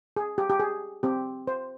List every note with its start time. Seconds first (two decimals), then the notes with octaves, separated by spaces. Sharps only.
0.16 G#4
0.38 G4
0.50 G4
0.60 G#4
1.03 C4 G4
1.47 C5